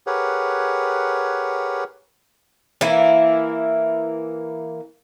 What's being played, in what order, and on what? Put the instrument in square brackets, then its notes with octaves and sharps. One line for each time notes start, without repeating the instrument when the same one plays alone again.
[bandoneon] G4 G#4 A#4 B4 C#5 F#5
[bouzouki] E3 A#3 E4